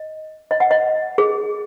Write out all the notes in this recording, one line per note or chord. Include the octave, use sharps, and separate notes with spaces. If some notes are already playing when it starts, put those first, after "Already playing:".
Already playing: D#5
D#5
F#5
D#5
G#4